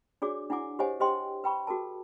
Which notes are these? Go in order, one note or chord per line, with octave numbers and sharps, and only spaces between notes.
D4 F#4 G#4 C#5 D5 D6
D4 E4 F#5 G#5 D6
G4 C5 C#5 D#5 F#5 G#5
G4 C5 D#5 G5 C6
B4 G5 B5 C#6
F#4 G#4 A#4 A5